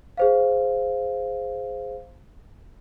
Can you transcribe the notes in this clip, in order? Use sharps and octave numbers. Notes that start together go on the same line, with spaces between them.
G#4 C5 F5